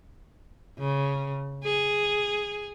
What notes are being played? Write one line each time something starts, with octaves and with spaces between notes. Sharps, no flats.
C#3
G#4